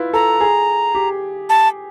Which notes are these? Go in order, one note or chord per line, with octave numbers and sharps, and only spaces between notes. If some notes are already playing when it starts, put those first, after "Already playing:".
Already playing: E4 F4 B4
A4 A#5
G#4
G4
A5